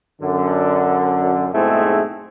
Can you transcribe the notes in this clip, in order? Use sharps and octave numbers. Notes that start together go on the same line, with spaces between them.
F#2 D3
B1 G#2 A3 C4 E4 G#4